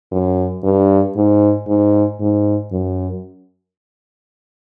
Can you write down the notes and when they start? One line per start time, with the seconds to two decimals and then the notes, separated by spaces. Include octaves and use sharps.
0.12 F#2
0.64 G2
1.16 G#2
1.67 G#2
2.20 G#2
2.72 F#2